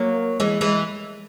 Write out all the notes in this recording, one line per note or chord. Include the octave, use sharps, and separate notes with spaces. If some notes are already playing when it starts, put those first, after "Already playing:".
Already playing: F#3 A#3
E3 G#3
E3 G#3